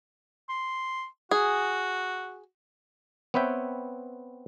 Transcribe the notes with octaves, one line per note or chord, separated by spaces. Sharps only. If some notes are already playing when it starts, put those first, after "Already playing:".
C6
F#4 G#4
B3 C4 B4 C#5 E5 G5